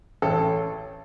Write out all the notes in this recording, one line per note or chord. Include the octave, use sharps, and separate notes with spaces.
A1 A4